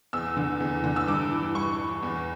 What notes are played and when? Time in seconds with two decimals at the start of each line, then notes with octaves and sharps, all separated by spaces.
0.13 E2 E6
0.37 D3
0.60 E2
0.84 D3
0.96 E6
1.07 G2 D6
1.31 E3
1.55 G2 C#6
1.79 E3
2.03 E2